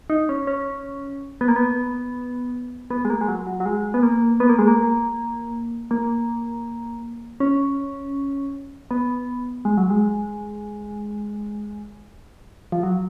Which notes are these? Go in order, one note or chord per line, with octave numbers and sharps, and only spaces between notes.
D#4
C#4
C#4
B3
A#3
B3
B3
G#3
A#3
G#3
F#3
F#3
F#3
G#3
B3
A#3
B3
A#3
G#3
A#3
A#3
C#4
B3
G#3
F#3
G#3
F3
F#3